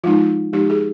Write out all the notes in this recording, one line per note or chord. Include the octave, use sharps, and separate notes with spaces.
F3 G#3 D#4 F4
F3 G#3 D#4 G4
G#4